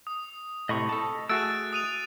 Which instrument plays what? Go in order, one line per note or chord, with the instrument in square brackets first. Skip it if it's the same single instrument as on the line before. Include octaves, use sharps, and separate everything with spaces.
[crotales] D#6
[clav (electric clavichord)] A2 C3 [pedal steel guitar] D#5 B5 C#6
[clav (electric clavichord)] A4 A5
[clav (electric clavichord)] A3 F#4 G#4 [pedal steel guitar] E6 [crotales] F#6 A6 D7
[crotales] D#6 D#7 F7